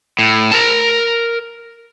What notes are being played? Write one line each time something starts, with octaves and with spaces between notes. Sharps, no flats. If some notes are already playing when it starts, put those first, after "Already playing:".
A2
A#4 A5